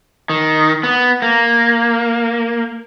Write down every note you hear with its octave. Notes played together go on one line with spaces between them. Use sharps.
D#3
B3
A#3